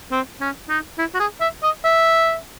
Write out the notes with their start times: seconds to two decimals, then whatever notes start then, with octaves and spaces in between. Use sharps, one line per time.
0.11 C4
0.41 C#4
0.69 D#4
0.98 E4
1.14 F#4
1.20 G#4
1.41 E5
1.63 D#5
1.85 E5